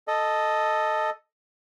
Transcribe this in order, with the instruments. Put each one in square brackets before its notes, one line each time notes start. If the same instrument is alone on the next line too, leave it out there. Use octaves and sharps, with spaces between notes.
[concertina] A4 D#5